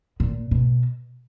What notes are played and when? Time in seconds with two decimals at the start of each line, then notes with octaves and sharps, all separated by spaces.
0.20 A#2
0.51 B2